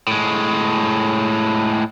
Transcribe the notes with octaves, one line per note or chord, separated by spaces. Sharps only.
A2 G#3